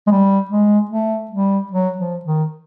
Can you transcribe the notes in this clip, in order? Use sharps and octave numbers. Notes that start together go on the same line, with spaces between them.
G#3
G3
G#3
A3
G3
F#3
F3
D#3